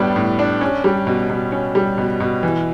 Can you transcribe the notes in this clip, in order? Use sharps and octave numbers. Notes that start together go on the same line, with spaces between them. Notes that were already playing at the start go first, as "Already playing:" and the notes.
Already playing: A2 G3 B3 D4
A2
D4
C#4
G3
B2
B2
C#4
G3
B2
B2
E3